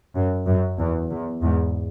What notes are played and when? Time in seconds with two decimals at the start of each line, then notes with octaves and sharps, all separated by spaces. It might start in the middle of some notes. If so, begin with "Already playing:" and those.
0.14 F#2
0.47 F#2
0.78 E2
1.10 E2
1.42 E2 G#2